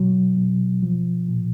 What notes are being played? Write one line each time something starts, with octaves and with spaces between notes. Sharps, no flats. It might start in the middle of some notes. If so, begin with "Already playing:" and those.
Already playing: B2 F#3
B2
F3
A#2